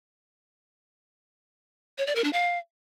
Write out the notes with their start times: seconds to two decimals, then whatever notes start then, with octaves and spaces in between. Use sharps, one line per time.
1.98 C#5
2.07 D5
2.15 A#4
2.24 D4
2.33 F5